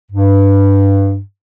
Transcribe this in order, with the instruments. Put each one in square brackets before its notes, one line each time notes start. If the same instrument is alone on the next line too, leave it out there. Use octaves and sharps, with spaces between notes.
[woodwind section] G2